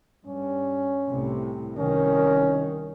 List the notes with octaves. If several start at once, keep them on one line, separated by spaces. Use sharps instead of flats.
G2 C#4
C2 A2 C3
C2 D#3 C#4